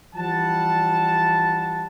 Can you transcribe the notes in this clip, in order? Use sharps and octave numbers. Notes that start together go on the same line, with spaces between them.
E3 F3 G3 F#5 A5